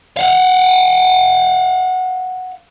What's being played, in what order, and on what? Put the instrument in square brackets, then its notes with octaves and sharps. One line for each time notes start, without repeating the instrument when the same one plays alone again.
[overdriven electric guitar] F5 F#5